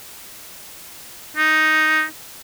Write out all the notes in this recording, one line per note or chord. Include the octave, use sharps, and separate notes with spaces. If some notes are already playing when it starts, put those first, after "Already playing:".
D#4